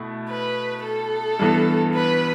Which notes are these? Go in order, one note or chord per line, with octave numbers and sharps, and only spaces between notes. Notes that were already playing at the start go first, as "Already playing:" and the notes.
Already playing: B2 A3 E4
B4
A4
G2 E3 B3
B4